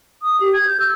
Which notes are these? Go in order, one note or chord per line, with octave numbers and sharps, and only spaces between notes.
D#6
G4
G#6
G6
E6